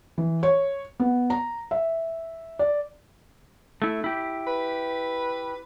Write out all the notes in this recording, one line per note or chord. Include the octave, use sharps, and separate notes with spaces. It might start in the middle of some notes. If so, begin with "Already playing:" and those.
E3
C#5
B3
A#5
E5
D5
A3 E4
E4 G4
B4